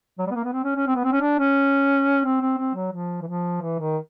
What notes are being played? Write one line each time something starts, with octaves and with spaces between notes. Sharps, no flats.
F#3
G3
B3
A#3
B3
C4
C#4
C#4
C4
B3
C4
C#4
D4
C#4
C4
C4
C4
F#3
F3
E3
F3
E3
D#3